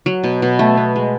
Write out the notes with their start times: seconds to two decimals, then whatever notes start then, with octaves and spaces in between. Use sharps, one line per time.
0.06 F#3
0.24 B2
0.42 B2
0.59 A3
0.77 B3
0.96 G#3